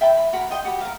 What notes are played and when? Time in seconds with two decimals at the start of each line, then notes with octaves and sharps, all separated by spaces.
0.01 E5 G5 A5 B5
0.17 B5
0.33 F#4 A#4 B5
0.50 F4 D#5 G5
0.65 F#4 G4 B5
0.81 A#4 F5